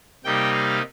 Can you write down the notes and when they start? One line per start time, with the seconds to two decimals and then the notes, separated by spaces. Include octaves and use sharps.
0.24 C3 G3 A#3 D#4 G5
0.53 F5